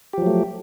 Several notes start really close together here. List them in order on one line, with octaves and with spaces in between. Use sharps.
G4 F3 F#3 A3